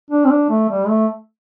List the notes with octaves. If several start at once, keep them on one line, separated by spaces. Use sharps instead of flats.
D4
C4
D4
A3
G3
A3